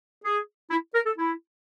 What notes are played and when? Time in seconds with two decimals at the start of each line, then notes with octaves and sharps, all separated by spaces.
0.24 G#4
0.71 E4
0.94 A#4
1.06 A4
1.18 E4